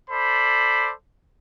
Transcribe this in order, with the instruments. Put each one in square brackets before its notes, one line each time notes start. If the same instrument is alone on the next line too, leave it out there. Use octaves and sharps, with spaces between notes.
[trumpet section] A4 C5 D5 B5